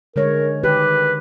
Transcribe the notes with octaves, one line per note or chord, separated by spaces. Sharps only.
D3 G#3 A#4 C#5
D#3 G4 B4